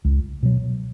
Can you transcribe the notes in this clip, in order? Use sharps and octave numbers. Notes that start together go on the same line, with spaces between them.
C#2
B2 F#3